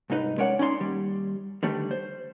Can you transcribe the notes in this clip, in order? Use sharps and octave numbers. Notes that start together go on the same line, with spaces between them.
C2 G#2 D#4 B4
G#3 C#4 A#4 C#5 D5 F#5
C#4 D#4 D5 C6
D#2 G3
D3 D#3 G3 A3
C5